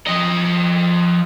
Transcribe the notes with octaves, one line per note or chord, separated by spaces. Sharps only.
F3 D#5